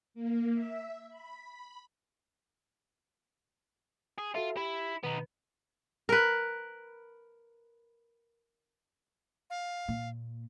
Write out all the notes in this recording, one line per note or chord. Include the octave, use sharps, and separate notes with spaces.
A#3
E5
B5
G#4
F4 F#4 A4 E5
E4 G4
B2 D#3 B3 D#4 B4
A#4 B4
F5
A#2